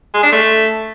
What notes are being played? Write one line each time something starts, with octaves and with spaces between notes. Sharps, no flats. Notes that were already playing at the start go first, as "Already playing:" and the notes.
G#3
D4
A3